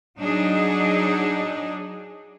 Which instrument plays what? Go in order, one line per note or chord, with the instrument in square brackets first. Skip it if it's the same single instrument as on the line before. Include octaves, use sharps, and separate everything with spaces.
[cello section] F#3 D4 D#4 G#4